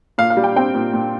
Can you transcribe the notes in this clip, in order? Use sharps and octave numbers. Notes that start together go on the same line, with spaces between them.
A#2 F5
F5
G3
G5
C4 G5
A#2
A#2